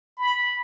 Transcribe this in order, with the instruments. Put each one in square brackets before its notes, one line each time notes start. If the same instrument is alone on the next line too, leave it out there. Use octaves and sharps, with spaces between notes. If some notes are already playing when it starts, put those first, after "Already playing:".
[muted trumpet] B5